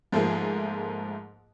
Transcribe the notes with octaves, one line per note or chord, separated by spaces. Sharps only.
G#2 F3 A3 A#3 G#4